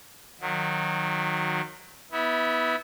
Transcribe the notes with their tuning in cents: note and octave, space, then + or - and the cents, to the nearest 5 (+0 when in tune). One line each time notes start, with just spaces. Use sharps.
D#3 -15 F#3 -25
B3 +0 E4 -25